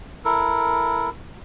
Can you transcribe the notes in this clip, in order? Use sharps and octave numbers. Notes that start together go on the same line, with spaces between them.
E4 A4 A#4